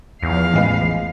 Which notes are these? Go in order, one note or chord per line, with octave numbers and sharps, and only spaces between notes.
E2 F3 F5
A1 G#3 B4